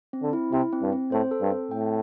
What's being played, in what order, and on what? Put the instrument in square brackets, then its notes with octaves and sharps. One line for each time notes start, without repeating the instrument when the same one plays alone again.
[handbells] C4
[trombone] D3
[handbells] E4
[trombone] C3 [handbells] E4
[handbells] C4
[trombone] G2
[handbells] C4
[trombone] A2 [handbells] C5
[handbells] A4
[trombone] G2
[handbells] C4
[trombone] A2 [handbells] G5